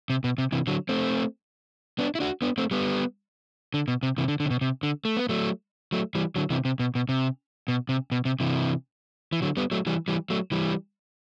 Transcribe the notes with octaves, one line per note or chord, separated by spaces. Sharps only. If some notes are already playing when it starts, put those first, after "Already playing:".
C3
B2
C3
C3 E3
D3 F#3
A3 C4
B3 D4
E4
D4 F#4
B3 D4
A3 C4
G3 B3
D3
B2
C3
C3 E3
D3
D3
C3
B2
C3
D3
A3
B3
F#3 A3
F#3 A3
E3 G3
D3 F#3
C3 E3
C3
B2
B2
C3
B2
C3
B2
C3
C3 E3
E3
D3 F#3
G3 B3
F#3 A3
E3 G3
E3 G3
F#3 A3
E3 G3